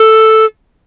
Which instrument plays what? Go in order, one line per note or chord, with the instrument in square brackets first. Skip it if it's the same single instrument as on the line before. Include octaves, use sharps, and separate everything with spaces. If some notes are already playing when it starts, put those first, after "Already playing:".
Already playing: [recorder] A4